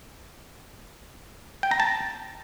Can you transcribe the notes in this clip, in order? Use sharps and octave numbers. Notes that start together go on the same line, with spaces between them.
G5
A#5
A5